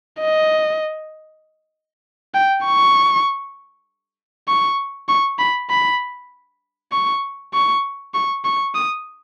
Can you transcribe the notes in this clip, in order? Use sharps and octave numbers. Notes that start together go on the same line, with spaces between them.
D#5
G5
C#6
C#6
C#6
B5
B5
C#6
C#6
C#6
C#6
D#6